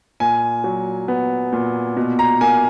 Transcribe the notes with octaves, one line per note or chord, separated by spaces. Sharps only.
A#2 G#5
F#3
B3
A#2
B2
A#5
A#3 G#5